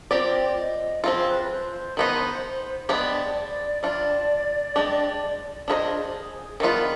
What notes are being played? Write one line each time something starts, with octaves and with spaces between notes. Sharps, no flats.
C4 F4 G4 D5
D#5
F3 C4 F4 G#4
C5
B4
B4
C5
D#3 B3 D#4
G#3 B3 D4 G4 D5
D5
G3 D4 F4 D5
G#3 D4 G4
D4 F4 G#4 B4 C5 D#5
G4
G#4
D#3 G3 B3 F4